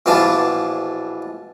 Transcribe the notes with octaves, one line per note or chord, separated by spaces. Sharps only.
A#1 B2 E3 D4 F4 A5